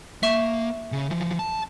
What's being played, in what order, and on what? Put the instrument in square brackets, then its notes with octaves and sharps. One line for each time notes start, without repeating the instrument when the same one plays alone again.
[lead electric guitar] A#3 [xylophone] E5 C#6 E7
[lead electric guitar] C#3
E3 F3
A5